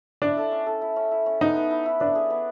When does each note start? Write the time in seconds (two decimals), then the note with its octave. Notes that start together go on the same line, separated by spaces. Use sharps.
0.22 D4 E4
0.37 A4
0.52 C#4
0.66 A4
0.82 E4
0.96 C#4
1.11 E4
1.26 C#4
1.41 B3 D#4
1.56 B4
1.71 E4
1.86 E4
2.00 D4 B4
2.15 G#4
2.30 B3